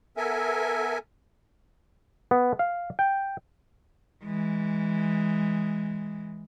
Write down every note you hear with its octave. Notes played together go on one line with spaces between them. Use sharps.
B3 A4 A#4 E5 G#5
B3
F5
G5
E3 G#3